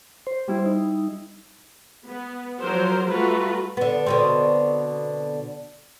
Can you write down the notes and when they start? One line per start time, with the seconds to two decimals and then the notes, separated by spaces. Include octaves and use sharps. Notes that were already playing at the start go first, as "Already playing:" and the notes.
0.27 C5
0.48 G3 E4
0.66 D#4
2.08 B3
2.62 F3 F#3 A#4 C5
3.09 G3 A3 F4 F#4 B4 A#5
3.77 D3 B3
4.06 B2 D3 C4